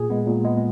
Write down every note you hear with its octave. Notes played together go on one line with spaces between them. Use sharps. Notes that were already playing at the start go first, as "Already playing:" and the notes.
Already playing: A#2 G#4
G#3 B3
A#2
G#3 B3